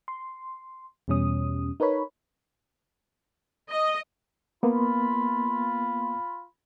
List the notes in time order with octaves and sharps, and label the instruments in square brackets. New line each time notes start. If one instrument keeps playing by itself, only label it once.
[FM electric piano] C6
E2 B2 G3 C#4 D#6
D#4 A#4 B4 C#5 B5
[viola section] D#5
[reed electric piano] A#3 B3 [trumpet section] F4 B5